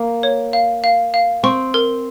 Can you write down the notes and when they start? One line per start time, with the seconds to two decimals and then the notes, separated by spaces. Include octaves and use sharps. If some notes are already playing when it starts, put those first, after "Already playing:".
Already playing: A#3
0.23 C#5
0.53 F5
0.84 F5
1.14 F5
1.43 C4 C#6
1.74 A#4